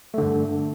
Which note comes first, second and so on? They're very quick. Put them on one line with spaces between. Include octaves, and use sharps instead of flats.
A3 D3 G2